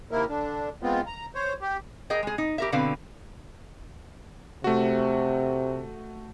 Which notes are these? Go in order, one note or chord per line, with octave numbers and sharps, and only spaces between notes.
C3 D#3 A#3 E4 A#4
D3 D4
G#3 B3 C4 F4
A#5
C5 C#5
G4
G#4 A#4 D#5 G5
G#3 G#4
D#4
G4 A#4 E5
B2 D3 C4 B4 F5
C3 A3 F#4